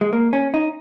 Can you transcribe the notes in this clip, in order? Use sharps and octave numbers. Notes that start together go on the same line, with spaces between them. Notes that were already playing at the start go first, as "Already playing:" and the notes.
G#3
A#3
C#4
D#4